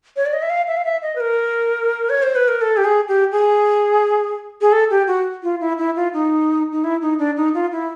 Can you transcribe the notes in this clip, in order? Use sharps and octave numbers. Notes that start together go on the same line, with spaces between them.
C#5
D5
D#5
E5
F5
E5
F5
E5
D#5
B4
A#4
C#5
C5
B4
A#4
A4
G4
G#4
G4
G#4
G#4
A4
G4
F#4
F4
E4
E4
F4
D#4
D#4
E4
D#4
D4
D#4
F4
E4